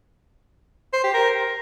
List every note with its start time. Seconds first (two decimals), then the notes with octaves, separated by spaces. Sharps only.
0.94 C5
1.04 G4
1.14 A#4